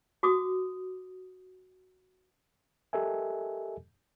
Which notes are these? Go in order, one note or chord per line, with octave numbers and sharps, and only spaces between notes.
F#4 D6 D#6
G4 A4 A#4 D#5 E5 G#5